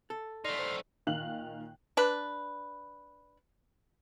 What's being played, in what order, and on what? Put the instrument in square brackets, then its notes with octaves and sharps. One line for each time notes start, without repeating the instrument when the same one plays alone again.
[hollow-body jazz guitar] A4
[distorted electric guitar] A3 D#4 [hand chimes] D5 [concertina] C6 F6
[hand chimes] C5
[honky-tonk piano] A#2 D#3 F5 F#6 F#7
[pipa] D4 B4